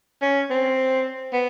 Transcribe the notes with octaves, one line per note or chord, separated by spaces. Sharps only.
C#4
C4
B3